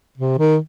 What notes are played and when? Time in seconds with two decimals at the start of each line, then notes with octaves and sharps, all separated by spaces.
0.18 C3
0.39 D#3